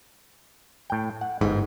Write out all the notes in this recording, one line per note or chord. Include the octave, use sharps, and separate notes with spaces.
A2 G5
F#5
G1 G#2